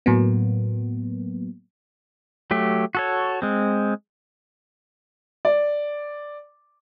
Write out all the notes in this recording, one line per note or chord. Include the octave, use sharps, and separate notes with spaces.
A2 F#3 A#3 B3
F#3 A3 G4
F#4 A4 C#5
G#3 C4
D5